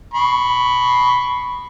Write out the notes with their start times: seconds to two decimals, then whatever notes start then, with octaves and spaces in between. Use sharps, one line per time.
0.14 B5 C#6